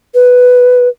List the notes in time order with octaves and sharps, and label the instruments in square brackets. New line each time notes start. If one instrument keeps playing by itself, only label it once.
[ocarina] B4